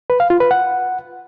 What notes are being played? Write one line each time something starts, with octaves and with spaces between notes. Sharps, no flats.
B4
F5
F4
B4
F#5